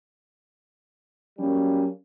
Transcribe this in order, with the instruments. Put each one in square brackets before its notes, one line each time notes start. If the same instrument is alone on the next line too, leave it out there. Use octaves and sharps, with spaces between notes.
[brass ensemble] F#3 G3 A#3 C#4